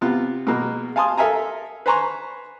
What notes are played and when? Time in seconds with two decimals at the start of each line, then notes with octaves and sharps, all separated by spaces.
0.01 C3 B3 F4
0.47 B2 G#3 A#3 B3
0.96 F5 G#5 A5 C6 D#6
1.18 A4 A#4 E5 F5 G#5 A#5
1.86 B4 C5 G#5 A#5 C6 C#6